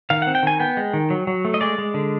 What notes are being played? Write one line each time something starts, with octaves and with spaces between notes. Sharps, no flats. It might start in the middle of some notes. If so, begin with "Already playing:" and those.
D#3 F5
C4 F#5
G5
D#3 G#5
B3 G5
G#3
D#3
F#3
F#3
A3
D#5
G#3 D5
G#3
D3